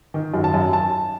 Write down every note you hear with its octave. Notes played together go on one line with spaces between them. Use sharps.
D#3
F#2
A5
F#2
A5